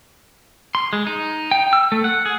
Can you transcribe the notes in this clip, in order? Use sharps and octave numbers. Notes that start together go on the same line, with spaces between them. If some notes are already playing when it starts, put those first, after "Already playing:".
C6
G#3
D#4
G5
E6
A3
F#5
G#4